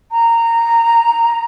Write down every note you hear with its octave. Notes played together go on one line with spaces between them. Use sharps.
A#5